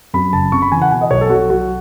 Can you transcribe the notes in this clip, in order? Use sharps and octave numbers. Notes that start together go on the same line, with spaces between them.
F#2 B5
F#1 A5
C#3 C#6
B5
E3 G#5
F#5
B2 G#5
D#5
B1 C#5
A4
F#3 F#4
B1 F#4